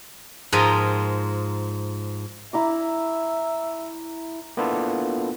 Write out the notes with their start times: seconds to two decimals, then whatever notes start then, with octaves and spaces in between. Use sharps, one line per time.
0.52 G#2 F3 A#4 D#5 G5
2.53 E4 E5 A#5 D6
4.57 A#3 B3 D4 E4 F4 A4